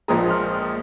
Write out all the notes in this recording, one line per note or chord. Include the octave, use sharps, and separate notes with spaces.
A#1 A#2 F3 G#3 A#5 D#6
C6 F6